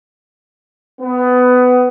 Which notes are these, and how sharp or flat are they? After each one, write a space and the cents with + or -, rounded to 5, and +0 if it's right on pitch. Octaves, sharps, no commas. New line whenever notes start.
B3 +20